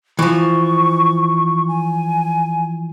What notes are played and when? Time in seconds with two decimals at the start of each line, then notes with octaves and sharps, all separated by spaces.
0.19 E3 F3 C#6
1.68 G#5